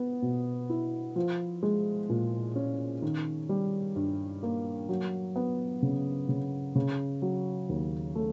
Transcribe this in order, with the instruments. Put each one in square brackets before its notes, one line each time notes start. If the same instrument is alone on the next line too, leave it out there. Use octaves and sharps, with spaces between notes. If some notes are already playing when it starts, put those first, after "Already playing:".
Already playing: [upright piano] B3
B2
E4
F3
G#3
A#2
C#4
D#3
G3
G2
A#3
F#3
B3
C#3
C#3
C#3
F#3
D#2
A3